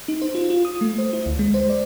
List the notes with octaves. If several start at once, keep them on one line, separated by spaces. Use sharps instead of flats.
D#4
C5
F4
F4
D#6
A3
C5
E4
D2
G#3
C5
D5